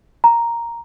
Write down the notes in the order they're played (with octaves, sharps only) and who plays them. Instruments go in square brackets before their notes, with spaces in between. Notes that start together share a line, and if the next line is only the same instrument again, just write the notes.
[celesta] A#5